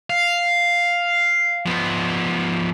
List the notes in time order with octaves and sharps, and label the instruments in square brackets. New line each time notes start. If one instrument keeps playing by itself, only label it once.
[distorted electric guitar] F5
F3 B3